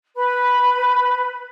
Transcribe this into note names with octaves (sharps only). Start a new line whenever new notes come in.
B4 B5